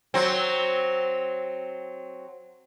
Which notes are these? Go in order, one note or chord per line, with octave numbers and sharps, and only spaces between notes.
F#3 C4